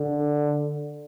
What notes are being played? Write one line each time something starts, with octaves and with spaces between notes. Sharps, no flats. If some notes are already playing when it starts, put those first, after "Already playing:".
Already playing: D3